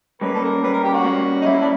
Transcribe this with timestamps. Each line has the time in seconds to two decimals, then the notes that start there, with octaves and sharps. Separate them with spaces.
0.21 G3 A#3 C#4 B4
0.34 A4
0.43 A#4
0.63 G3 A#3 C#4 B4
0.73 A#4
0.84 G4
0.94 F#4
1.04 G3 A#3 C#4
1.42 D#4
1.46 G3 A#3 C#4 E4
1.62 D4